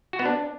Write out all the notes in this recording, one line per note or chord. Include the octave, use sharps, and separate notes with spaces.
F#4
B3
D4